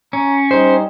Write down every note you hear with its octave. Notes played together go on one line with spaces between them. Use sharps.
C#4 A#5
G3 D#4 G4 C5